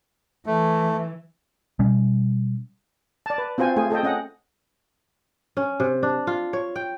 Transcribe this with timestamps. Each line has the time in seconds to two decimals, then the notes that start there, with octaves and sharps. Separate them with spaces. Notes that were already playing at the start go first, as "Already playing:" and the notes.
0.46 E3 A3
1.79 B2 G3 C#4
3.26 D5 A5
3.38 B4
3.58 C4 F4 F#4 C5 G#5
3.76 A3 F4 G#4 G#5
3.90 G#4 A4 D#5 G5
4.03 C#4 D#5 F#5
5.57 C#4
5.80 C3
6.03 D4
6.27 F4
6.53 C#5
6.76 G5